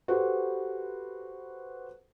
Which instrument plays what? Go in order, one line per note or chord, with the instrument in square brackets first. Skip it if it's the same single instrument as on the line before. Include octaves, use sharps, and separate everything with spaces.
[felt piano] F#4 G4 A4 B4 C5